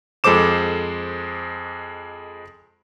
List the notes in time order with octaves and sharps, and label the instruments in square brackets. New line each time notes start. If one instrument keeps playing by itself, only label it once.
[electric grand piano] F2 G#3 A4 C5 D6 E7